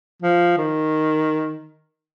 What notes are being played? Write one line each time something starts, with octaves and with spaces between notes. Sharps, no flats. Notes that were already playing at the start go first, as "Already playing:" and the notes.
F3
D#3